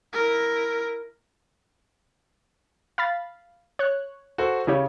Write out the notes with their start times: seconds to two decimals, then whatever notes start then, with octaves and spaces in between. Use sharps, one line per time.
0.13 E4 A#4
2.98 F5 B5 A6
3.79 C#5 F#6
4.38 F#4 A4 C5
4.67 C#3 E4 G4 C#5